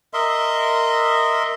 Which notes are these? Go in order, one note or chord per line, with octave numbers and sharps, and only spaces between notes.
A#4 D#5 E5 C6